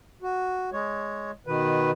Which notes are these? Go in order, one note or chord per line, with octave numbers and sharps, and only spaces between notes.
F#4
G#3 C#5
B2 D#3 B4